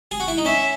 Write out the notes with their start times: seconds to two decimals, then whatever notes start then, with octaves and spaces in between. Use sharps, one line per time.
0.11 G#4
0.20 F#4
0.28 E4
0.38 D#4
0.45 C#4 E5